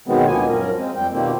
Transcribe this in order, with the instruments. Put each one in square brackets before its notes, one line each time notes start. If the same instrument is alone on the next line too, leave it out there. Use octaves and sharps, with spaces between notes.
[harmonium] B2 D#3 F#3 G#3 B3 C4
D2 A#2 A#3 B3 G#5
F#2 F3 C#4 A#4
G#3 C4
F2 G3 G5
B2 D#3 F3 G3 A#3 C4